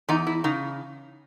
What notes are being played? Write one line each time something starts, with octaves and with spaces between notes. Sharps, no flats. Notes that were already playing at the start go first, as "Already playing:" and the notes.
E2 D#4
E4
C#3 D#4